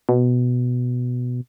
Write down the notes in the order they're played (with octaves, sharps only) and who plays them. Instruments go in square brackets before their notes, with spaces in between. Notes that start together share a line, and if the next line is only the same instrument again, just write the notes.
[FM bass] B2